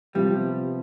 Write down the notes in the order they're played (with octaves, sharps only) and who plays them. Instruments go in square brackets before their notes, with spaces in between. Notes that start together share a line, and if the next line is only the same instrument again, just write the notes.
[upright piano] C3 F3 B3 [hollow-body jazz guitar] G3